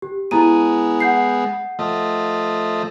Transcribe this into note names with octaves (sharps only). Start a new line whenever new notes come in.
G4
G#3 B3 E4 A#5 D#7
F#5 G6 C7
F3 A3 D#5